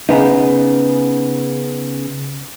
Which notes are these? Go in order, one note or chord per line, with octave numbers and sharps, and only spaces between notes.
C#3 B3 D#4